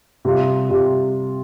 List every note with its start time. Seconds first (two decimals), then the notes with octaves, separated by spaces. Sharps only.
0.25 C3 G3 F4
0.69 C3 G3 F4